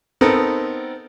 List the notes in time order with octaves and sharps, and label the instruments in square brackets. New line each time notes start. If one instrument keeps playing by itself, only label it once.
[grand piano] B3 C4 D#4 A4 A#4